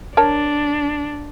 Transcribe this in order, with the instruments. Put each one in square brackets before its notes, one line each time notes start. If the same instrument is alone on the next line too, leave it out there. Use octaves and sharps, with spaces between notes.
[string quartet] D4 [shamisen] A#4 C#5 A5